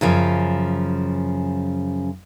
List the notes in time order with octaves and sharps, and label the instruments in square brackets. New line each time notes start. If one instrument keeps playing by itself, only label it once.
[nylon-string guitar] F#2 C#3 F3